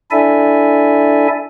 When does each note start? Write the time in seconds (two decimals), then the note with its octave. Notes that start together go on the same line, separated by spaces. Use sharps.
0.11 D4 E4 A4 D5 E5 G#5